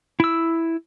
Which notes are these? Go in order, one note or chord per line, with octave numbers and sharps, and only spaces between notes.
E4 E6